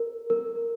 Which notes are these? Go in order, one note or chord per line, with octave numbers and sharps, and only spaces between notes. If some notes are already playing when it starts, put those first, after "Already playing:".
Already playing: A#4
A#4